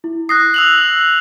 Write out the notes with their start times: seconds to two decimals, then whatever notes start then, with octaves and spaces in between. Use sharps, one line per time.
0.04 E4
0.29 D#6 F#6 A#6 C7
0.54 E6 F7 F#7